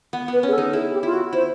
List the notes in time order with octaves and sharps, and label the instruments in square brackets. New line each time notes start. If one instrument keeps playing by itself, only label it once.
[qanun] B3
[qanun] B3 [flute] B4
[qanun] C#4 [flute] G#4
[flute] A4
[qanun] D#4
[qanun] E4 [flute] G#4
[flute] G4
[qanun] E4 [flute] F4
[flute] F#4
[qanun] E4 [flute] C5